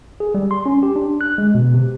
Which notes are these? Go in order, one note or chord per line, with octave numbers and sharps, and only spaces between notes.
G#4
G3
C6
C#4
G4
D4
F#6
G#3
B2
C3